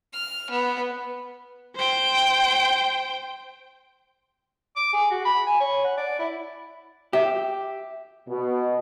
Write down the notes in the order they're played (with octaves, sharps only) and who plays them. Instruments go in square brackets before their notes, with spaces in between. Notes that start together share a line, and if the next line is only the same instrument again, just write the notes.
[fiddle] F6
B3
[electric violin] C5 G5
[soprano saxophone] D6
G#4
F#4
B5
G#5
C#5
F#5
D5
E4
[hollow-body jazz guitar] G4 [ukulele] E5
[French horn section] B2